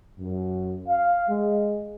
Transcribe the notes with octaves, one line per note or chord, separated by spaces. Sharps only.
F#2
F5
G#3